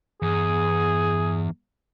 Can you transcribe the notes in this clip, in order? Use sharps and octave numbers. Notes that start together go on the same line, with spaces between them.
E2 G2 G#4